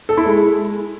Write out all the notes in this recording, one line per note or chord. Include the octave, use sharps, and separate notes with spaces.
A4
E4
G#3